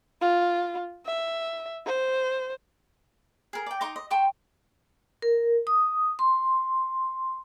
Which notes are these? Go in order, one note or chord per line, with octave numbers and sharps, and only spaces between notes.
F4
E5
C5
G#4 A#4
D5 G5
D#4 A#5 C6 D6
D#5
G5 A5 C6 C#6
A#4
D#6
C6